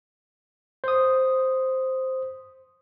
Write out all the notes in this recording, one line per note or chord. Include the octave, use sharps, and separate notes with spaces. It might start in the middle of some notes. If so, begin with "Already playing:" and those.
C5 D#6